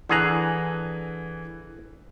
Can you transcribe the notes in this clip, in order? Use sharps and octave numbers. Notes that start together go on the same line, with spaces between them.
D3 E3 G#4 A#5 F#6